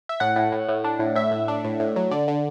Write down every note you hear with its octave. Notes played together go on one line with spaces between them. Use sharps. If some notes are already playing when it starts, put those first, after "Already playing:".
E5
A2 F#5
A2
A2
A2
D4
A2
A2 E5
A2
D4
A2
A2
F#3
D3 D5
D3